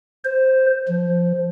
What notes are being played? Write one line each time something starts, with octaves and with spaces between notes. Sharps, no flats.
C5
F3